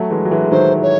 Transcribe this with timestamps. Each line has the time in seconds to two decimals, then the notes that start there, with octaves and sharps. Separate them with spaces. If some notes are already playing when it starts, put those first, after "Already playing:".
Already playing: F#3 A3
0.10 E3 G#3
0.25 F#3
0.31 E3 G#3
0.44 G#3
0.52 D#3 F#3 C5
0.83 C#5